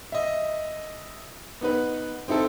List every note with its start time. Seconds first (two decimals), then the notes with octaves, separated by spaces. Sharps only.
0.12 D#5 E5
1.61 B3 D#4 B4
2.28 C4 D#4 E4 A4